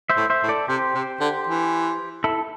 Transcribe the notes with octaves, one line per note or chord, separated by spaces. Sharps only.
C5 E5
A2
C5 E5
A2
A4 D5
C3 G4 C5
C3
D3
E3
E4 A4